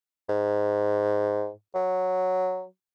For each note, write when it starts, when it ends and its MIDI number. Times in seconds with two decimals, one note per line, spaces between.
0.29 1.50 44
1.75 2.64 54